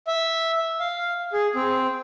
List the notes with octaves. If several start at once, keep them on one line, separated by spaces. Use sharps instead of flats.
E5
F5
G#4
C4